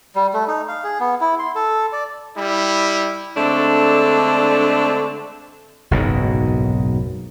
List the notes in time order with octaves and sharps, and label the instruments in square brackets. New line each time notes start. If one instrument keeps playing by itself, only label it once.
[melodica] G3
A3
D#4
F5
G#4
B3
E4
C6
A4
D5
[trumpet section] G3 E4
[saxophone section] D3 G#3 A3 C4 D4
[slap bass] F#1 B1 G#2 B2